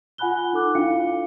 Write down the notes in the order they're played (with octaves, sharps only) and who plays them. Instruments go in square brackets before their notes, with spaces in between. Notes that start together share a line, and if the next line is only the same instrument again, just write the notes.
[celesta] F4 F#5 G#5 B5 F#6 G7
D#4 A4 D6 F#6
D4 E4 F4 F5 G5 C#7